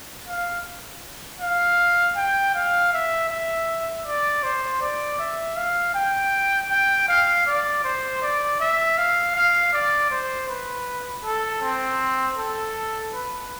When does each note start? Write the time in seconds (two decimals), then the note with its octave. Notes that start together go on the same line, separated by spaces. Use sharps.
0.27 F5
1.40 F5
2.16 G5
2.54 F5
2.93 E5
3.30 E5
4.06 D5
4.43 C5
4.82 D5
5.19 E5
5.56 F5
5.94 G5
6.70 G5
7.08 F5
7.47 D5
7.84 C5
8.22 D5
8.60 E5
8.98 F5
9.35 F5
9.73 D5
10.11 C5
10.49 B4
11.25 A4
11.62 C4
12.37 A4
13.14 B4